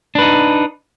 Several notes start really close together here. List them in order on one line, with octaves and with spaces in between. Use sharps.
D4 B4 D#4